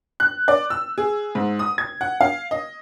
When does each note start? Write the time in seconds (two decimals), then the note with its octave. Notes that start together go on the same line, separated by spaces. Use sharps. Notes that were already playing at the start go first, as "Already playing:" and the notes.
0.20 F#6
0.48 D5
0.70 E6
0.98 G#4
1.35 G#2
1.59 D#6
1.78 G#6
2.01 F#5
2.21 F5
2.51 D#5